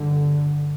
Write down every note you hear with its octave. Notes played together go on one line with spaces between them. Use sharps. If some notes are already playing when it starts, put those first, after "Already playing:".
Already playing: G1 G2 D3